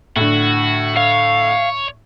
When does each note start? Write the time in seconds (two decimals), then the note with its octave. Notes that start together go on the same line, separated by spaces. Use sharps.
0.16 A2 D3 F#4
0.97 C#5 F5